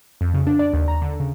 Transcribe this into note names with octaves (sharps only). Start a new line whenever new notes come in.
F2
C#3
D4
D5
D#2
A#5
D3
C#3